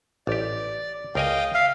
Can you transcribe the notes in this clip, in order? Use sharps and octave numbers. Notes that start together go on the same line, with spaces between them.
A1 G4 D5
C#2 A#4 D#5 F5 G5 G#5
E5 F5